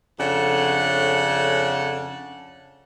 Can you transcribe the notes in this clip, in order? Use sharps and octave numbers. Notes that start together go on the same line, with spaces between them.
F2 C#3 D4 A4 C#5 F#5